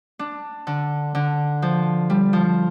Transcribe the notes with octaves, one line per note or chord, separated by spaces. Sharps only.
D4
D3
D3
F3
G3
F3